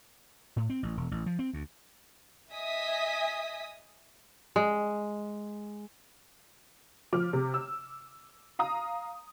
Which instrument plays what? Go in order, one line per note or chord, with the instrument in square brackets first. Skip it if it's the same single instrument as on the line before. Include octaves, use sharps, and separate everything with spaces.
[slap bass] A2
C4
A1
E1
A1
F3
C4
D2
[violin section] D#5 E5 G#5 D#6 B6
[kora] G#3
[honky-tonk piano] F3 D6 F6
C3
E6
F5 A#5 D#6